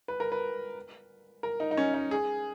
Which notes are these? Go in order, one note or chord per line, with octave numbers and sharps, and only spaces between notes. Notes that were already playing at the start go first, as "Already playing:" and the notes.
B4
A#4
B4
A#4
D#4
D#4
C#4
D#4
G#4